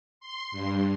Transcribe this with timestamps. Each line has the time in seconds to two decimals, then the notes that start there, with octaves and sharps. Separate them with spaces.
0.20 C6
0.52 G2